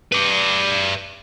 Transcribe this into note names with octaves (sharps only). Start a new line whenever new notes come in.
B4 D5